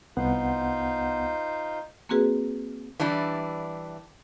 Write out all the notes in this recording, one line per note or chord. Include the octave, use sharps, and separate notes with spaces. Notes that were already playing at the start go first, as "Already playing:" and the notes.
C2 B3 D#4 F4 C5 F#5
A#3 C4 F#4 G#4 B4
E3 G3 D4 E4